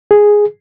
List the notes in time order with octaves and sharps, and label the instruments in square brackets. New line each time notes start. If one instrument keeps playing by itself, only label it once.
[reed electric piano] G#4